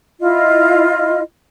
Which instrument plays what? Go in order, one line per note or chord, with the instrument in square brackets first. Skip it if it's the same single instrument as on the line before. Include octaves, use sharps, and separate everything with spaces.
[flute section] E4 F4 D#5